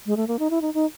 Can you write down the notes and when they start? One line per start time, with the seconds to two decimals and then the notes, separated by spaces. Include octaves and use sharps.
0.06 G#3
0.16 A3
0.28 A#3
0.39 D#4
0.50 E4
0.61 D#4
0.74 D#4